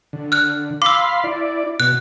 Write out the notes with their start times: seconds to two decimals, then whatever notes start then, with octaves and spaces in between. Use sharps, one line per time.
0.13 D3
0.32 F6 F#6
0.82 F5 B5 C6 D6 E6
1.24 E4 D5
1.80 B2 F#6